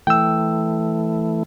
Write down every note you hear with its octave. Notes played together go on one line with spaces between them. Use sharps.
E3 A3 G5 E6